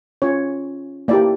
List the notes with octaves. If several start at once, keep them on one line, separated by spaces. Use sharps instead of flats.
C#4 F4 C#5
A#3 E4 G4 D5